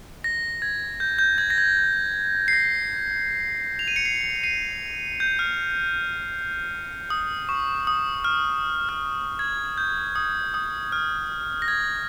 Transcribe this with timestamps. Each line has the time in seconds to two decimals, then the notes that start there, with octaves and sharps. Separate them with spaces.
0.24 A#6
0.62 G#6
1.00 G6
1.19 G6
1.38 G#6
1.50 A#6
1.58 G#6
2.48 C7
2.53 A#6
3.79 F7
3.88 D#7
3.96 C#7
4.05 C7
4.43 C7 D#7
5.20 G6
5.39 F6
7.10 D#6
7.49 C#6
7.87 D#6
8.24 F6
8.89 F6
9.39 G#6
9.78 G6
10.15 D#6
10.54 D#6
10.92 F6
11.62 A#6
11.68 G#6